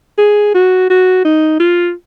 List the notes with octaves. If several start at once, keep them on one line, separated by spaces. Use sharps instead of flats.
G#4
F#4
F#4
D#4
F4